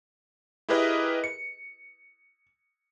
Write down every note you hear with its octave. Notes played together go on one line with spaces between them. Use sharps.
E4 G4 G#4 A#4 B4 D#5
C#7